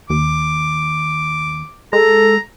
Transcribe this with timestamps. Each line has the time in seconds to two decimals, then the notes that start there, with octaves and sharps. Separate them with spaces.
0.10 D#2 D6
1.93 G#3 A4 A#5